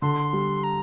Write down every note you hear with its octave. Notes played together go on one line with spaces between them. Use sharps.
D3 C6
G3
A#5